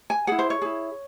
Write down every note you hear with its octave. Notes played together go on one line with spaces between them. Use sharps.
G#5
E4 G#4 F#5
C5
C#5
E4 G#4